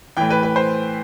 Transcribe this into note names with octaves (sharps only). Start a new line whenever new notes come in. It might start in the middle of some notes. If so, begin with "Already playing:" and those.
A2 E3 G5
B4
B4
C5